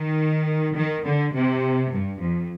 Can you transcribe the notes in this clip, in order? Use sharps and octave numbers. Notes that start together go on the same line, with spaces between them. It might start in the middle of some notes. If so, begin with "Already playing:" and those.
Already playing: D#3
D#3
D3
C3
G2
F2